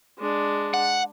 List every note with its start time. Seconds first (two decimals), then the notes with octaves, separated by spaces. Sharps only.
0.18 G#3 D4
0.74 F#5